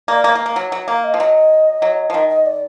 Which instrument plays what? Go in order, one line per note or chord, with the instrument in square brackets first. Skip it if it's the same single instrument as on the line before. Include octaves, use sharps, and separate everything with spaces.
[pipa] A#3 [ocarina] D5
[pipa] A#3
A#3
A#3
F#3
F#3
[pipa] A#3 [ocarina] F5
[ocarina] D#5
[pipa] F3
[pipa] F#3 [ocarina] D#5
[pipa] F#3
F3
[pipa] D#3 [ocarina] D#5
[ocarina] D#5
D5